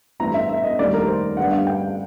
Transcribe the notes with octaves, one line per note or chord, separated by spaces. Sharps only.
G2 E3 A3 C4 A#5
E5
E5
D#5
F1 D#2 D#3 G3 D5
A#4
C5
G2 D3 G3 B3 D4 F#5
F5
G5